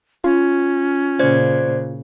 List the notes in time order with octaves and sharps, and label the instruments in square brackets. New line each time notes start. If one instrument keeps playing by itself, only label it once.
[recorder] C#4 [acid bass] F4
[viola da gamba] A#2 C#3 [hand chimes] C5 D5 G#6